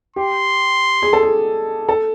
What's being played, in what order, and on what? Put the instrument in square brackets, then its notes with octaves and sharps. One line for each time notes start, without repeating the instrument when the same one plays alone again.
[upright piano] G4 [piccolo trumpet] C6
[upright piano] G#4
A4
G#4
A4